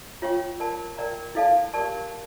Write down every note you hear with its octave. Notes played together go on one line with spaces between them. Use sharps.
F4 C#5 G5 C#6
A#4 D5 A5
A#4 D5 G5 A#5
E4 A4 D5 F5 A5
G4 A#4 D5 A5 C#6